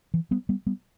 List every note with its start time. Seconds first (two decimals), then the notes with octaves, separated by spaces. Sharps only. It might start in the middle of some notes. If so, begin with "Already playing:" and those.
0.14 E3
0.31 G3 B3
0.49 G3 B3
0.66 G3 B3